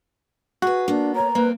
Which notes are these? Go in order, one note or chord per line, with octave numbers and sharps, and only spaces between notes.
F#4 G#4 B4
A#3 B3 D4
C#5 A#5
A#3 C4 B4 D5